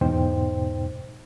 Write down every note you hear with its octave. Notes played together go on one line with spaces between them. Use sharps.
E2 G#2 B2 D#4 C5 G5